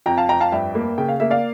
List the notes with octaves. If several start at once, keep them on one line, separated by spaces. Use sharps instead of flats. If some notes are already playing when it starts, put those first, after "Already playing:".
F2 G5 A#5
F5 A5
F2 G5 A#5
F5 A5
G2 E5 G5
A#3
C#3 G5
F5
A#3 E5
D5 F5